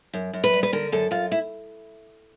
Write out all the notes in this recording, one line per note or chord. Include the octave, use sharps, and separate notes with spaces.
F#2
F#2
B4
G3
B4
D3 A#4
F#2 A4
F#2 F4
E4